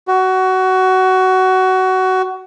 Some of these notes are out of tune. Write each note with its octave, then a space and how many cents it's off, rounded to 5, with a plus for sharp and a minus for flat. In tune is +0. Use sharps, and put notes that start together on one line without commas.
F#4 +20